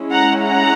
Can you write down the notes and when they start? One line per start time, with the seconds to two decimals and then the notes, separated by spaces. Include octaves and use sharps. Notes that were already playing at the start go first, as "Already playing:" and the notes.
Already playing: G#3 C#4 E4
0.12 F#5 A#5
0.41 F#5 A#5